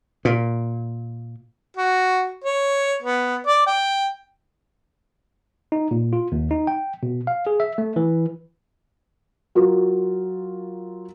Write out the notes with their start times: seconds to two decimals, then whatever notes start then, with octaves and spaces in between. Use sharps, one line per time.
0.25 A#2
1.77 F#4
2.44 C#5
3.02 B3
3.47 D5
3.66 G5
5.72 D#4
5.91 A#2
6.13 F4
6.32 D#2
6.51 D#4
6.67 G5
7.03 B2
7.27 F5
7.47 G#4
7.60 E5
7.78 A3
7.96 E3
9.55 F#3 F4 A#4